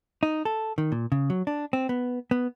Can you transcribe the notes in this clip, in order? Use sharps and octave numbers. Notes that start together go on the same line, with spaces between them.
D#4
A4
D#3
A#2
C#3
F#3
D4
C4
B3
B3